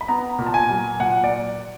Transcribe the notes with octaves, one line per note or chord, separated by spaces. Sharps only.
B5
B3 A#5
A#2
A5
G#5
F#3
A#2 F#5
D5